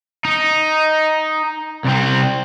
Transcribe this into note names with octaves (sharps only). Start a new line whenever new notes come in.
D#4
C2 C4